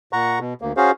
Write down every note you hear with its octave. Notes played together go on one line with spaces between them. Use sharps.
A#2 F#5 A#5 C#6
B2
D2 A#3
C#4 F#4 G#4 C5 F5